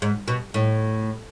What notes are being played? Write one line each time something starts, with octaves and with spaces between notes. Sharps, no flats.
G#2
B2
A2